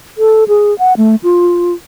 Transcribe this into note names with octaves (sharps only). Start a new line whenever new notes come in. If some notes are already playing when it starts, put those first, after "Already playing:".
A4
G#4
F#5
A3
F4